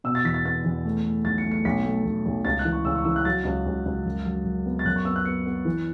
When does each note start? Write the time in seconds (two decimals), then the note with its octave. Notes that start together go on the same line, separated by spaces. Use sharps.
0.04 B2 E6
0.15 A6
0.24 E2 B6
0.34 A6
0.45 B3 A6
0.64 E2
0.85 A3
1.04 A3
1.25 B1 A6
1.38 C#7
1.45 A3
1.52 C#7
1.65 B1 B6
1.84 A3
2.05 B1
2.26 B1
2.45 C#2 A6
2.59 F#6
2.65 E3
2.72 C#6
2.85 C#3 E6
2.96 C#6
3.05 E3 E6
3.16 F#6
3.25 F#3 A6
3.45 C#2
3.66 C#2
3.86 C#2
4.05 F#2
4.26 F#3
4.45 F#2
4.66 B3
4.79 A6
4.85 F#2 F#6
4.96 C#6
5.05 B3 E6
5.16 F#6
5.25 B3 C#7
5.46 B3
5.65 E3